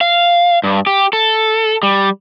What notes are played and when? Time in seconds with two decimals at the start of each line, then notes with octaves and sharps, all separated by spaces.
0.01 F5
0.64 G2
0.87 G4
1.13 A4
1.83 G3